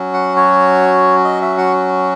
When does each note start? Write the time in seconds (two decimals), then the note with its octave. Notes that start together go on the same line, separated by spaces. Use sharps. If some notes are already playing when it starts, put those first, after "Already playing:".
Already playing: F#3 C#4 F#4
0.14 F#5
0.36 C#5
1.24 D#5
1.41 E5
1.58 F#5